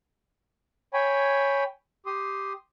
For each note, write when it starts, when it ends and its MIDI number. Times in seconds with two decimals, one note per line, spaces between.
0.94 1.64 73
0.94 1.64 79
0.94 1.64 80
0.94 1.64 83
2.06 2.53 67
2.06 2.53 84
2.06 2.53 87